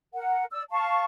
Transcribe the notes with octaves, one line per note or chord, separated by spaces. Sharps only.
A#4 F#5
D5 E6
F5 A5 C#6